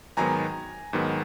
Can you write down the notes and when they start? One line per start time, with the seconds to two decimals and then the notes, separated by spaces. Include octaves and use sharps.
0.17 G#2 D#3 F#3 B3 G#5 A#5
0.93 G#2 D#3 F#3 B3